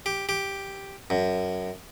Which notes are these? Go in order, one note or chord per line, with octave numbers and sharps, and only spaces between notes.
G4
G4
F#2